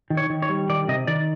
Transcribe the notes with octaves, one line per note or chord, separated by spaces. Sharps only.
D#3
C#5
D#3
C#5
G3
D#3 D5
C3 D#5
D#3 D5